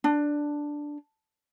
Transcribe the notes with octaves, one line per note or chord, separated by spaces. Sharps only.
D4